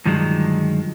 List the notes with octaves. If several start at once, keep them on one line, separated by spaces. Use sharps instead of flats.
G2 D3 D#3 F3 F#3 G#3